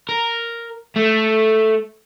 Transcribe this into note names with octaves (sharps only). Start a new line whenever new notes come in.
A#4
A3